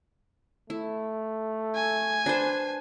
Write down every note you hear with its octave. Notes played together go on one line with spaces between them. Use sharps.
A3 E4
G#5
D4 B4 C5